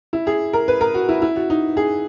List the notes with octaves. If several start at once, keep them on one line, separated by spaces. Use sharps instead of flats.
E4
G#4
A#4
B4
A#4
F#4
E4
E4
F#4
D#4
G#4